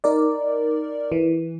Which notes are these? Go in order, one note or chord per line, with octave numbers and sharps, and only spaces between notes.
D#4 A#4 D5
E3